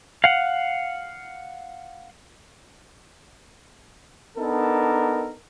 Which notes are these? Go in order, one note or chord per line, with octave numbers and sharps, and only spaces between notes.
F5 F#5
B3 D4 D#4 A4 A#4